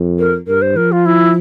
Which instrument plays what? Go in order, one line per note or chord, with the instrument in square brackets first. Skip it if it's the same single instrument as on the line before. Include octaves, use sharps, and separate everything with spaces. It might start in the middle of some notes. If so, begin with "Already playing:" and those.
Already playing: [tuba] F2
[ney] A#4
[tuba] G2 [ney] A#4
[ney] C5
[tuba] F3 [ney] A#4
[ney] F4
E4